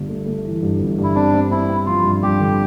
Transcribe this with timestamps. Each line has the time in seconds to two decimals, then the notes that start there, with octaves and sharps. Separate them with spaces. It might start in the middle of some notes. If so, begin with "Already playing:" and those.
Already playing: G1 G2
0.09 A3
0.26 A3
0.44 E3
0.62 G2
0.79 G1
0.98 G2
1.03 E4
1.15 C4 D4
1.34 C4
1.51 C4 E4
1.69 C4
1.86 F3 F4
2.04 G2
2.23 G2 G4
2.40 D3